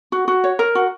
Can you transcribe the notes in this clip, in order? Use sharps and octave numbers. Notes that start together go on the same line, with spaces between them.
F#4
F#4
C#5
A#4
F#4